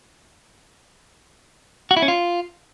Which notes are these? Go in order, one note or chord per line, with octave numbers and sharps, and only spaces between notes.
F#4
E4
C#4
F4